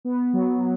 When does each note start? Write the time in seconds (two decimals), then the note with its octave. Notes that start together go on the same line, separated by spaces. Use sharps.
0.05 B3
0.33 F#3